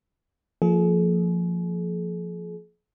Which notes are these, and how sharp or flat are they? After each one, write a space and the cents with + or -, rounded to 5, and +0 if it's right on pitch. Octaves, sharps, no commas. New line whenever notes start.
F3 +0 A#3 -30 G#4 +40